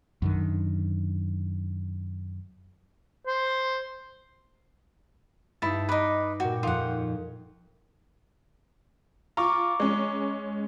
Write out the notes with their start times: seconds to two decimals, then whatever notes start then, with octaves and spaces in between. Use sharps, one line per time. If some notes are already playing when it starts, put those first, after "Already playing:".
0.22 F#2 D3 D#3
3.27 C5
5.62 G2 D#4 E4 A5
5.89 D#4 B4 D#5 D6
6.40 A#2 F#4 G5
6.63 F2 D#4 F4 F#5
9.37 F4 A#5 C#6 D6
9.80 G#3 C#4